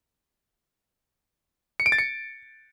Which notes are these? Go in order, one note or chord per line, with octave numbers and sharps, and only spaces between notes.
C#7
D7
A6
C#7